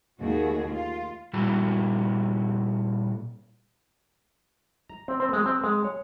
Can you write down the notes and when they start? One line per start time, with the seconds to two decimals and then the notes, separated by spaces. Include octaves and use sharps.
0.21 D#2 A3 F#4 G#4
0.69 F4
1.33 A#2 G3 E4 F#4
4.89 A#5
5.08 C4
5.20 C4
5.33 G#3
5.46 C4
5.64 G#3
5.84 C#5